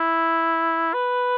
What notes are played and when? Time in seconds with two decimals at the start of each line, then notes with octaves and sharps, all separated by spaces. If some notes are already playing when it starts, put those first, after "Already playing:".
Already playing: E4
0.94 B4